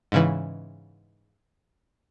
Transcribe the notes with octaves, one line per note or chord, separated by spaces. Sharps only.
G#2 C#3 E3